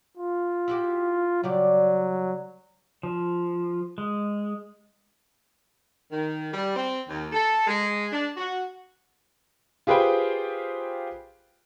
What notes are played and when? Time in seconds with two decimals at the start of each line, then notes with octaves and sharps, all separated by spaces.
0.17 F4
0.68 E4 F#4 G4
1.43 C#3 F#3 G3 D5
3.03 F3
3.98 G#3
6.12 D#3
6.54 G3
6.75 C4
7.09 D#2
7.33 A4
7.67 G#3
8.12 D4
8.37 F#4
9.87 F4 G4 G#4 B4 C5 G5